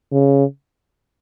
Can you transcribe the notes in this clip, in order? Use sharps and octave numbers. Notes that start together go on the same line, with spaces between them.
C#3